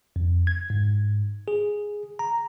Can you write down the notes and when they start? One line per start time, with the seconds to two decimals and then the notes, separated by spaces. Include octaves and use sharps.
0.16 F2
0.47 G#6
0.70 G#2
1.48 G#4
2.19 A#5